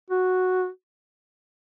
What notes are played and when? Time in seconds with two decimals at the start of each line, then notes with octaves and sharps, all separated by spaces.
0.10 F#4